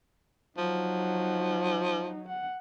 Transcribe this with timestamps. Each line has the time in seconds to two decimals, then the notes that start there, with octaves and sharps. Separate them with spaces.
0.58 F3 F#3 D#4
2.28 F#5